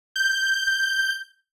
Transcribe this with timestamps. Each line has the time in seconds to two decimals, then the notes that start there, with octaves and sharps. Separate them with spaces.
0.16 G6